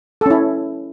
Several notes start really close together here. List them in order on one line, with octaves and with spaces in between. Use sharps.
A4 C#4 E4